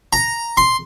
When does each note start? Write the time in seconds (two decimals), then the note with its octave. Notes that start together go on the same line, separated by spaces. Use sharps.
0.13 A#5
0.57 C6